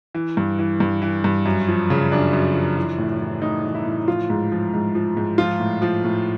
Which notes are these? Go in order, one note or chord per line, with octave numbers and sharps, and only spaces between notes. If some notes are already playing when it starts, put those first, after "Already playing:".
E3
G2
E3
G2
E3
G2
F#2
F3
C#3
F#2 D4
F#2
F3
E3
A2
E3
A2 D#4
E3
E4
A2
F3 F4
G#2
F3
G#2
F3
G#2
F3 F4
A2
F3
A2